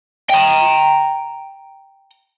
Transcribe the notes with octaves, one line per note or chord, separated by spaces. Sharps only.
G5 A#5